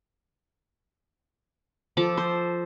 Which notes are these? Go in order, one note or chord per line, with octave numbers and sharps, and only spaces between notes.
F3 A4 D6
C5